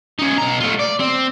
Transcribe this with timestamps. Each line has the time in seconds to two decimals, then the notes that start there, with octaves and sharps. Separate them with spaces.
0.19 C#4 D#4
0.38 B2 A#5
0.60 A3 F4
0.79 D5
0.99 C4